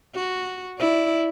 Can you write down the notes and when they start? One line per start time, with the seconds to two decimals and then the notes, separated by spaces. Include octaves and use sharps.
0.15 F#4
0.78 E4 D5